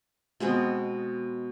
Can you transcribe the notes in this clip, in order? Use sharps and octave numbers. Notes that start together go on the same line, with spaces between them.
B2 G#3 B3 C4